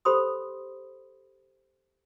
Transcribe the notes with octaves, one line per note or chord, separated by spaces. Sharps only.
G4 A4 C5 B5 C6 D#6